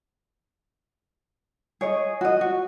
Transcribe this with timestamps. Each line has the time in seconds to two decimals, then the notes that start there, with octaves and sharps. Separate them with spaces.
1.81 G#4 C#5 D#5
2.21 F#4 D#5
2.41 F#4